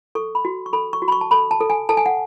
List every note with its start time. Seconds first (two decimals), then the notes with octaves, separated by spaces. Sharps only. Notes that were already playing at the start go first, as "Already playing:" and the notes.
0.15 A4 C#6
0.35 B5
0.45 F#4
0.66 C#6
0.73 A4 B5
0.93 C#6
1.02 F#4
1.08 B5
1.12 C#6
1.21 A5
1.31 A4 B5
1.51 A5
1.61 A4
1.70 G#5
1.89 A4 A5
1.97 G#5
2.06 F#5